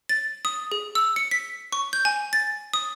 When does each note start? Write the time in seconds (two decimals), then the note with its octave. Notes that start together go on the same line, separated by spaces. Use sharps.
0.09 A6
0.45 D#6
0.72 G#4
0.95 E6
1.16 C#7
1.31 B6
1.72 C#6
1.93 G6
2.05 G#5
2.33 A6
2.74 D#6